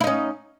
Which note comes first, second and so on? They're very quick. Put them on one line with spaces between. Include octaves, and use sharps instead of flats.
E4 D#4 C#4